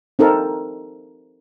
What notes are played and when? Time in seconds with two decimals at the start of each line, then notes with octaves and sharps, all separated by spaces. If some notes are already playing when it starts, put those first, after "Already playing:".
0.19 C4 D#4 A4 A#4